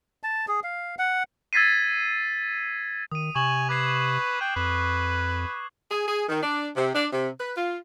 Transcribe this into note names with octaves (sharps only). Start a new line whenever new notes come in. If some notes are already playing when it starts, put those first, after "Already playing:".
A5
G#4
F5
F#5
E6 G#6 A6 B6 C7 D#7
D#3 D#6 D#7
C3 G#5 C#6 E7 F#7
B4 D6 G#6 C7
G5 F#6
F2 B4
G#4
G#4
D#3
D4
C3
D4
C3
B4
F4